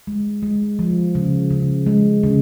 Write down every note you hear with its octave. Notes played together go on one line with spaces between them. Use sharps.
G#3
G#3
F3
C#3
C#3
G#3
C#3